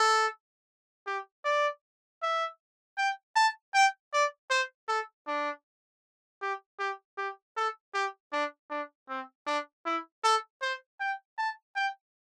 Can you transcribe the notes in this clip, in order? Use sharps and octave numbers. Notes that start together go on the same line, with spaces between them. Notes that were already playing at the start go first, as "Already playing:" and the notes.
Already playing: A4
G4
D5
E5
G5
A5
G5
D5
C5
A4
D4
G4
G4
G4
A4
G4
D4
D4
C4
D4
E4
A4
C5
G5
A5
G5